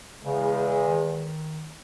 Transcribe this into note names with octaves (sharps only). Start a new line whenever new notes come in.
E2 C#3 G#3
D#3